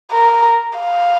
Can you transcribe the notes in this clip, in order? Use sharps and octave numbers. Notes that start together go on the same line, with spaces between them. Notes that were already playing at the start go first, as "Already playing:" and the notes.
A#4
F5